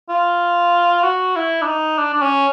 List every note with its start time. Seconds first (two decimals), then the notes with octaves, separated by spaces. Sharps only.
0.09 F4
1.04 F#4
1.36 E4
1.62 D4
1.67 D#4
1.98 D4
2.14 D4
2.22 C#4